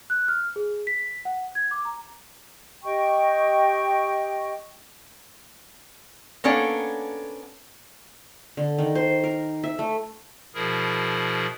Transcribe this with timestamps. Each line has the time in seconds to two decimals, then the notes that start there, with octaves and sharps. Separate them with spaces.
0.10 F#6
0.28 F6
0.56 G#4
0.87 B6
1.25 F#5
1.55 G#6
1.71 D6
1.85 A#5
2.84 G4 D#5 G5 C#6
6.44 A#3 B3 C#4 D4 A4
8.57 D3
8.78 D#3
8.95 C5
9.24 A#4
9.64 E5
9.79 A3
10.54 B2 F3 E4 G#4 A#4